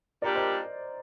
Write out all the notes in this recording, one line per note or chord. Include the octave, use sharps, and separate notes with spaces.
A#2 G3 D4 G4 A#4 D5
C5 D#5